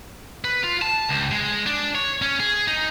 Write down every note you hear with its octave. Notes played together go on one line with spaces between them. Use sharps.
B4
F4
A5
C#2
G#3
D4
C#5
C#4
G#4
D#4